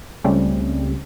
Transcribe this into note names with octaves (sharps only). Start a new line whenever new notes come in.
C#2 C#3 G3 A3 C4 C#4